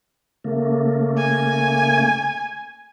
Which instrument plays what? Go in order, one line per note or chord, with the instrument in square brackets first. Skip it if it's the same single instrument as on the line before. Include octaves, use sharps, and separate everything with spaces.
[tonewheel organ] C#3 A3 A#3
[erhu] G#5